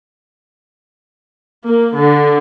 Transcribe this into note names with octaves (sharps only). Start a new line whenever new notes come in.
A#3
D3